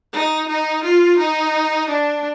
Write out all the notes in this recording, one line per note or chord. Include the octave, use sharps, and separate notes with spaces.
D#4
D#4
F4
D#4
D4